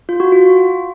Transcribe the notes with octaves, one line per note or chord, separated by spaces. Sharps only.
F4
F#4
F4